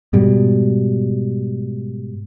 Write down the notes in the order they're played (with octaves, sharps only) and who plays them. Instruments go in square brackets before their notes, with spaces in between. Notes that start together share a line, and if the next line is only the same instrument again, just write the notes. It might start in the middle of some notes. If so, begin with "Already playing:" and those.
[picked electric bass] G#2 B2 G3